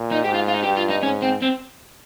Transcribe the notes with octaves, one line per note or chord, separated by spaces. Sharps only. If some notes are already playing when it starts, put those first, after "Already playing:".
Already playing: A#2
D#4
G#2 G4
F4
F4
D#4
G2 G4
F4
D#4
G#2 C#4
C4
C4